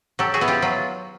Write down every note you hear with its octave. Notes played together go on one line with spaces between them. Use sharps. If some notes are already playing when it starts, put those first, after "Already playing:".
F#3 G4 A4
F#4 G#4
B3 E4
F4 G4
F#3 F4